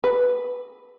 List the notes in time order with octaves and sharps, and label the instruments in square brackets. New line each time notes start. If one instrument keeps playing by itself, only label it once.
[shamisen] B4